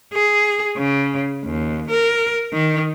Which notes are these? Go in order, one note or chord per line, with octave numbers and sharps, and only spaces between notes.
G#4
C#3
D#2
A#4
D#3